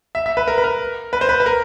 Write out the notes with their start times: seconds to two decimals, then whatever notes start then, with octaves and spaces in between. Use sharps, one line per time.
0.15 E5
0.26 E5
0.37 B4
0.48 A#4
0.58 B4
0.64 A#4
1.13 B4
1.21 C5
1.29 B4
1.40 B4
1.46 A#4